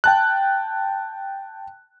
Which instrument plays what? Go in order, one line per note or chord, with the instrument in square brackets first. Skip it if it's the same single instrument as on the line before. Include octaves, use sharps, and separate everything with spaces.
[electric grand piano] G5 A5 F#6